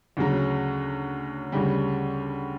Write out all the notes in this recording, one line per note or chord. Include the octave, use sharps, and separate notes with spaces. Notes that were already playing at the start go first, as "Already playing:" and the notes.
D2 C#3 F#3
D2 C#3 G3